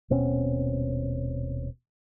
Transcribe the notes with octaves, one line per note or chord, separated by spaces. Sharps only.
D#1 B2 C4 C#4